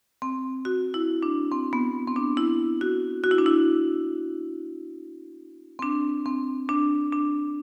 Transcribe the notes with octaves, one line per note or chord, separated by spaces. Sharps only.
C4
F#4
E4
D4
C4
B3
C4
D4
E4
F#4
F#4
E4
D4
E4
C4
D4
C4
D4
D4